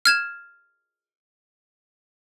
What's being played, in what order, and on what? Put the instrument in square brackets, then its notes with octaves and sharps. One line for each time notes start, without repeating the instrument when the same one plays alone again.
[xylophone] F6 G#6 E7